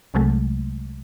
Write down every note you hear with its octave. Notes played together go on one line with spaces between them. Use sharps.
C2 C3 F#3 G#3 A3